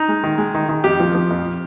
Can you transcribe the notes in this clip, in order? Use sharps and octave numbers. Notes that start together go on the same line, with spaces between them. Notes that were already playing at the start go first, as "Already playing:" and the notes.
Already playing: D#4
G#3
D#3
G#3
D#3
D#3
F2 G4
F3
F3
F2